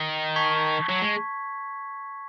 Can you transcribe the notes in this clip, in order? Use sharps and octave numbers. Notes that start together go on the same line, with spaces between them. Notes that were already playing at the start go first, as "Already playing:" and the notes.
Already playing: D#3
A5 C#6 G#6 B6
F#3
G#3